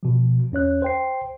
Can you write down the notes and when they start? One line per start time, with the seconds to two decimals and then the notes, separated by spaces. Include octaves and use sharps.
0.03 B2 F3
0.52 E2 C#4 C#5 F#6
0.82 C5 G5 C7